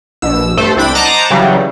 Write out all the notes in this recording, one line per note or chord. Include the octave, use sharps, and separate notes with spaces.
A#1 B2 E6
G2 A3 A4 C5
C2 C4 D4 G5 B5 A6
C5 D#5 F#5 A5 A#5 D6
C#3 E3 F#3 G3